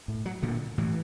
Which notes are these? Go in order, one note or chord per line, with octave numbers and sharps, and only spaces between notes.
A2
F#3
A#2 D3
A2 E3